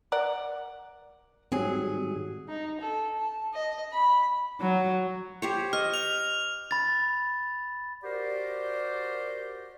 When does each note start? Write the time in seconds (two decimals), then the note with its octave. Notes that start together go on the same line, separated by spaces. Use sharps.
0.12 A#4 D5 F#5
1.52 G#2 D#3 F#3 G3 C4 G#4
2.48 D#4
2.80 A4
3.19 A5
3.54 D#5
3.92 B5
4.61 F#3
5.42 G4 C5 C#5
5.73 D#5 F6
5.94 F7
6.71 B5 A6
8.03 F#4 G4 A#4 C5 D5